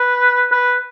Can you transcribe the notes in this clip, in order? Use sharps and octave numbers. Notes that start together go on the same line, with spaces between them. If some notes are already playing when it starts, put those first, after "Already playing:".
Already playing: B4
B4